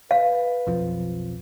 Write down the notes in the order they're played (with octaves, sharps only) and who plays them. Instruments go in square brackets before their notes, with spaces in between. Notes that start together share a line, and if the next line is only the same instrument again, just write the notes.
[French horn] B4 [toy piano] F5
[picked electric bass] B1 F2 F3